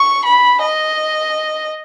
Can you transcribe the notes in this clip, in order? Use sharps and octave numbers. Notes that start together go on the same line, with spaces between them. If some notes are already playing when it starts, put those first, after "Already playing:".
Already playing: C#6
B5
D#5